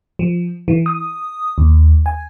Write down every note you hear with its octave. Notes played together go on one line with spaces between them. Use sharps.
F3
E3
D#6
D#2
G#5